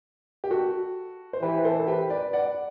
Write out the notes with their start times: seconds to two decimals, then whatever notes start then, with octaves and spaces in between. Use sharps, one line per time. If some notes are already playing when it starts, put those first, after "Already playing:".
0.44 G4
0.51 F#4 A4
1.33 C5
1.42 E3 G4 B4
1.64 A4 C5
1.80 A4
1.87 G4 B4
2.10 B4 D5
2.33 D5 F#5